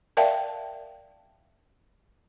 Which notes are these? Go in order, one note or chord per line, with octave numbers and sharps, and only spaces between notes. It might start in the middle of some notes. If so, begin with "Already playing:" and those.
A#4 D5 E5 F5 G5 A5